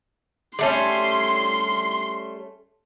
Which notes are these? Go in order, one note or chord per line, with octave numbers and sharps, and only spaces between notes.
G3 A3 C#4 C6